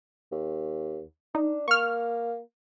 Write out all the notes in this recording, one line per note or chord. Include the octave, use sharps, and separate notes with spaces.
D#2
D4 D#4
A#3 C#6 F6